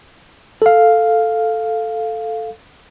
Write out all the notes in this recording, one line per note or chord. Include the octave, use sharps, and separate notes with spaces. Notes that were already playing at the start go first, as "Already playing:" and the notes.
A4 F5